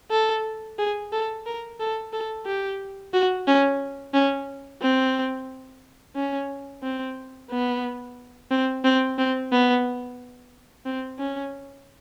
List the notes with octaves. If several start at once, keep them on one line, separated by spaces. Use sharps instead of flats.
A4
G#4
A4
A#4
A4
A4
G4
F#4
C#4
C#4
C4
C#4
C4
B3
C4
C4
C4
B3
C4
C#4